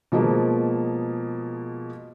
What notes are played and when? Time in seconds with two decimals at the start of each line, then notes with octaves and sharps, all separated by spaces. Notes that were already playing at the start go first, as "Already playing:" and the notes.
0.12 B2 F3 G#3 A#3 B3